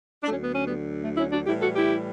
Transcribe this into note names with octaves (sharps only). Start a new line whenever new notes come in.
D4
D2 D3 F#3 A3 C#4
B3
C#4
G3 B3
A3
C#4 E4
D4 F#4
A2 E3 G3 E4 G4
F#4 A4
E4 G4